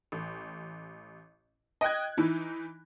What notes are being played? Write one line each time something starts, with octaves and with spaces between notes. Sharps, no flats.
A1
D#5 G5 F#6 G#6
E3 D#4 E4